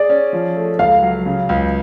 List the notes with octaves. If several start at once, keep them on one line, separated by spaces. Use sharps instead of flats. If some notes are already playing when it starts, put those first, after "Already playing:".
Already playing: G#4 D5
C#4
F3
A3
C#2 F5
F#3
C#3
C#2